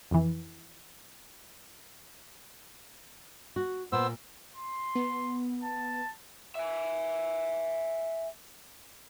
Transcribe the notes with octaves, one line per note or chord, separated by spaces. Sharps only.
F2 E3
F#4
A#2 B3 C5 E6
C6
B3
A5
E5 G#5